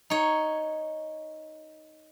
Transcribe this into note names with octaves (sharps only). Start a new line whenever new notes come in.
D#4 C#5